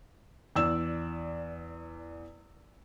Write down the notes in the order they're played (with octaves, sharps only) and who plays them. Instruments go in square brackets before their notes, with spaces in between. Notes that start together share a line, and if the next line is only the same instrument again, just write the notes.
[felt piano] E2 D5 E6 E7